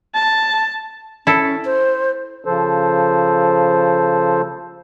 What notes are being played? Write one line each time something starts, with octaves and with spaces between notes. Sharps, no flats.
A5
C#4 E4 A4
C5
C#3 F3 A4 C5